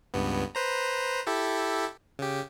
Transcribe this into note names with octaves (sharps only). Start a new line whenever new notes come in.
C#2 G2 B3
B4 C5 A#5
E4 G4 A4
C#3 G4